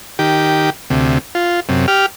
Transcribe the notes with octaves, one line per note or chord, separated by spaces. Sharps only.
D#3 G4
D2 C3
F4
F#2 C3
G4 F6